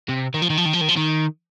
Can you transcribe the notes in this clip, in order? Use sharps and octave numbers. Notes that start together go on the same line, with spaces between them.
C3
D#3
F3
D#3
F3
D#3
F3
D#3
F3
D#3